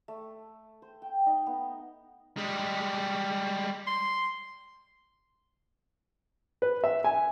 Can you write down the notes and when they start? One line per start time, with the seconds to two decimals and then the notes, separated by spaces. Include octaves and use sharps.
0.08 A3
0.82 C5
1.02 G5
1.26 D#4
1.46 B3
2.37 G3 G#3
3.87 C6
6.62 B4
6.84 E5
7.04 G#5